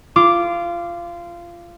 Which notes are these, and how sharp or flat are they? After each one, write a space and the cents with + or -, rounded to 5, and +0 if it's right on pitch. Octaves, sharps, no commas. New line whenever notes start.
F4 -20 D6 +0